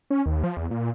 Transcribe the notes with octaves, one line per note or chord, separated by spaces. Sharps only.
C#4
D#2
F3
E2
A#2